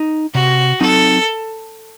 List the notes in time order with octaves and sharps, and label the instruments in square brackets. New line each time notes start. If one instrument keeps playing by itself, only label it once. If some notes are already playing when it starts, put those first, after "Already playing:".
Already playing: [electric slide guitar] D#4
[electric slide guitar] C3 [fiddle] F#4
[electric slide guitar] F#3 C4 D#4 [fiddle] A4